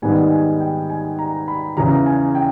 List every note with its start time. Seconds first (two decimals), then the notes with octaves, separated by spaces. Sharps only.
0.02 G#2 D#3 G3 B3 D#4 G#5
0.31 G#5
0.60 G5
0.90 G#5
1.19 A#5
1.48 B5
1.77 E2 C#3 E3 A#5
2.06 G#5
2.35 G5